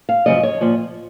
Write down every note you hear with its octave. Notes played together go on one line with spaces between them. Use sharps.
F5
F#2 C#3 F3 D#5
C#5
A#2 F3